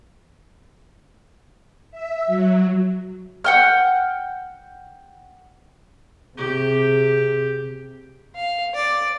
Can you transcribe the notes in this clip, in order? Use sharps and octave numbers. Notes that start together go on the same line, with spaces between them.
E5
F#3
F#5 G5 F6
C3 G4 G#4
F5
D5